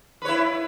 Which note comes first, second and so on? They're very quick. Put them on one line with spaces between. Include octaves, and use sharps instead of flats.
B4 C#5 E4